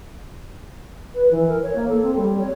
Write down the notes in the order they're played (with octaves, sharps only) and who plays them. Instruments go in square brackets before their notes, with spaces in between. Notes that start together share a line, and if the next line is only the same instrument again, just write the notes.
[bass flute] B4
E3
A#4
C#5
A#3
A4
C4
G3
C#5